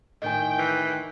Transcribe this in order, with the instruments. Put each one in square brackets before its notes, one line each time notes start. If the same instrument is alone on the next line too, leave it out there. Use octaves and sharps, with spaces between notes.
[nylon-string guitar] A2 D#3 [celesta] D#5 G#5 [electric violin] G5
[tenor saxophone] E3